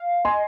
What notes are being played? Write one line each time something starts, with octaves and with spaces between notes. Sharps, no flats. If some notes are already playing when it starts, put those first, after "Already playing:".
Already playing: F5
D#5 G#5 C6